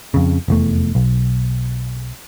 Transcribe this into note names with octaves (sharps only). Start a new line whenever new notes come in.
F2 C#3
F1 E2 A3
B1